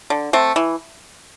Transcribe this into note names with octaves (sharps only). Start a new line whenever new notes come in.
D3
A3 C4
E3